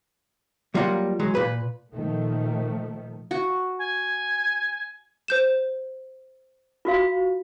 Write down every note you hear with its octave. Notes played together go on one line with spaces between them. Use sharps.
F#3 G3 A#3 F4 D#5 F#5
E3 F#3 G#3
A#2 B4
A#2 D#3 F3 A3
F#4
G#5
C5 G6 E7
F4 F#4 F5